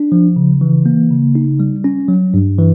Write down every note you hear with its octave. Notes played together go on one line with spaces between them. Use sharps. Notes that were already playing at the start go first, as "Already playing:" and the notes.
Already playing: D4
F3
C#3
E3
A#3
C#3
D#4
G3
C#4
F#3
G2
E3